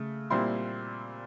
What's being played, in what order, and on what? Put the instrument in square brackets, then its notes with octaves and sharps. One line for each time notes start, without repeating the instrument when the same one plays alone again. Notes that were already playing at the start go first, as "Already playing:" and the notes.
Already playing: [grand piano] C#3 A3
A#2 G3 C4 E4 C6